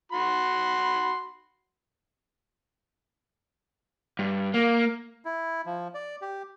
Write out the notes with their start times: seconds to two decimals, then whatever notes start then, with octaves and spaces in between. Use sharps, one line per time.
0.12 F#4 B5 C6
4.19 G2
4.54 A#3
5.25 E4
5.66 F3
5.95 D5
6.22 G4